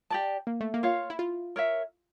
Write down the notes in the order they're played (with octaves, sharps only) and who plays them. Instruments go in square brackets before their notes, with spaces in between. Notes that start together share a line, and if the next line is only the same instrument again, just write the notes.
[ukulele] G4 D5 A5
[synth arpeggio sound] A#3
A3
A#3
[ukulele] F4 C#5 F5
[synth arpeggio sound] E4
F4
[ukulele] A#4 C#5 E5